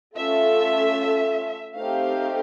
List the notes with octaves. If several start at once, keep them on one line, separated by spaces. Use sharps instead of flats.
A3 C#4 F4 A4 E5
A3 C4 D#4 G4 F5